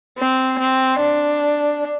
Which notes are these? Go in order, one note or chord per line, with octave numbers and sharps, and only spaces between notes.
C4
C4
D4